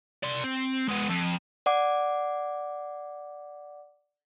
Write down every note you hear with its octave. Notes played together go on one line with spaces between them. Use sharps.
D5 C6
C4
G#3 B3
F2
D5 F#5 D6